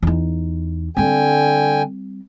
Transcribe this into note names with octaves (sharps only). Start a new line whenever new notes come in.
E2 D#4
D3 G3 C4 G5 G#5